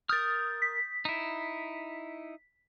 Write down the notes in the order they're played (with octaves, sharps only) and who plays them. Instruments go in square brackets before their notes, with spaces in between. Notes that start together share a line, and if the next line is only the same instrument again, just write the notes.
[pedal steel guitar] A#4 F6 [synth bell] D#6 G6 A6
[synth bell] B6
[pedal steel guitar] D#4 E4